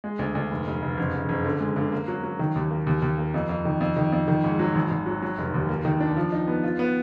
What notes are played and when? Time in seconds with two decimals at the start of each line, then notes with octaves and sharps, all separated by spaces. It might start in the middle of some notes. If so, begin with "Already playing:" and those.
0.04 G#3
0.19 D2
0.35 D2
0.51 F1
0.67 F1
0.82 F1
0.98 F#1
1.13 F#1
1.29 F#1
1.45 D3
1.60 G#3
1.76 D3
1.92 A#3
2.08 F#3
2.24 F#3
2.39 D#3
2.56 D#2
2.71 A#3
2.87 D#2
3.02 D#2
3.18 A#3
3.34 F2
3.49 F2
3.65 D#3
3.81 F2
3.96 D#3
4.12 F2
4.28 D#3
4.44 G#2
4.59 F#3
4.75 G#1
4.91 G#1
5.06 F#3
5.22 F#3
5.38 F1
5.54 D#2
5.69 A#3
5.85 D#3
6.00 D4
6.16 F3
6.32 D#4
6.47 B3
6.63 F4
6.79 B3